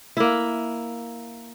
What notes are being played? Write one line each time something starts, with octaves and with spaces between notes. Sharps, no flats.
A#3 E4